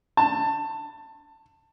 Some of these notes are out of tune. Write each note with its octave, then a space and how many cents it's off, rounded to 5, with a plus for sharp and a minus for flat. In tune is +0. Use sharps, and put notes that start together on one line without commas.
A5 +20